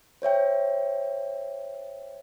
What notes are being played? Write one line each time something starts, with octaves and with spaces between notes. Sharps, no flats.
C5 C#5 E5 G5